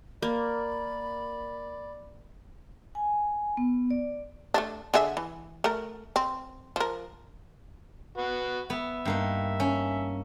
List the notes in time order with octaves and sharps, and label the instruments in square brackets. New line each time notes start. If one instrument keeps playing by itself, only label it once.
[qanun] A#3 [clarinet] D5 [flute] B5
[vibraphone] G#5
B3
D5
[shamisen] A3 A#3 D4
D3 G#4 E5
E3
A3 A#4
C4
F3 A#4
[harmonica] F#4 B4
[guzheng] B3 [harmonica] E5
[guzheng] G2 A#3 D#4
C#4